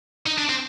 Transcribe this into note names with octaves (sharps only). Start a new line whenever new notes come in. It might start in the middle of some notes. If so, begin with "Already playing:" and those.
D#4
D4
C4